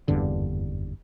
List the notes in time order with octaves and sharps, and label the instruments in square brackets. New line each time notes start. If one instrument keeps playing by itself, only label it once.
[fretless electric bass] F#1 E2 G2 D3